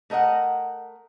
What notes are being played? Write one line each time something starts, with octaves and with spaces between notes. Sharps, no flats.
A3 A#4 D#5 E5 F#5